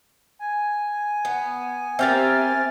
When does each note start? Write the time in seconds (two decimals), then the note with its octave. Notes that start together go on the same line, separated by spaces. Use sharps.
0.39 G#5
1.25 B3
1.99 C4 G4 A#4 E5 F6 A6